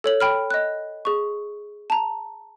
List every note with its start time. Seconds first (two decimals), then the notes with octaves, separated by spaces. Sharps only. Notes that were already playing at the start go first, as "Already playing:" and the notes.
0.04 A4 C#5 F#7
0.20 G5 B5 F6
0.51 D#5 F#6
1.05 G#4 C#6
1.90 A5 A#5